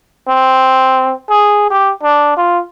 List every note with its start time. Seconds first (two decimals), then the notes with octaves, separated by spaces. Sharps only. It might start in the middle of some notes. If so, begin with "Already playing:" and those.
0.28 C4
1.30 G#4
1.71 G4
2.03 D4
2.37 F4